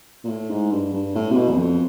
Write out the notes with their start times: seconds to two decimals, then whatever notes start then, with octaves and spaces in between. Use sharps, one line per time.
0.24 A#2
0.29 A2
0.50 G#2
0.71 G2
0.93 G2
1.15 A2
1.31 C3
1.36 B2
1.50 E2
1.57 F2